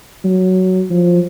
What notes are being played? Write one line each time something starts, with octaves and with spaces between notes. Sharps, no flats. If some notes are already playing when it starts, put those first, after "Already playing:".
F#3
F3